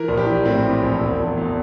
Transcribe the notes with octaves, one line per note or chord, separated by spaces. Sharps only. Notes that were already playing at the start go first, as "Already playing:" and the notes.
Already playing: E3 A#4
A#1
G4
E3
A2 C4
E3
A#1
E1
E1
E2